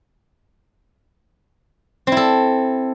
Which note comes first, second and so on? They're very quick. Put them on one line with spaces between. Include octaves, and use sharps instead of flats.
C4 E4 A4